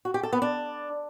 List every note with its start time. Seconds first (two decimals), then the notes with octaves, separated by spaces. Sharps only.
0.05 F#4
0.14 G4
0.23 A4
0.33 B3
0.42 D4